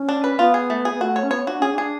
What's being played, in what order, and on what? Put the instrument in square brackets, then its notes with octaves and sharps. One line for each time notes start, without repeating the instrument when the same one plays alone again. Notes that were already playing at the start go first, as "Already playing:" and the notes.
Already playing: [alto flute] C#4
[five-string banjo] D4
B4
[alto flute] B3 [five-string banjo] F4
[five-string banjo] G#4
A3
G#4
[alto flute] B3
[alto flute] A3 [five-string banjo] F#4
[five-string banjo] C#5
[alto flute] C#4
[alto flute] B3 [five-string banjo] C#5
[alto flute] D4 [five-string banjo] F#4
[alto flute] C#4 [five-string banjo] G#4
[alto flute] D4
[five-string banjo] G#4